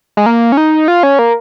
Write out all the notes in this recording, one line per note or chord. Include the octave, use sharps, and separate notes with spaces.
G#3
A#3
C#4
D#4
F4
C#4
A#3